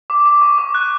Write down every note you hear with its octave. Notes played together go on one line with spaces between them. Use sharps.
D6
D6
C#6
D6
F#6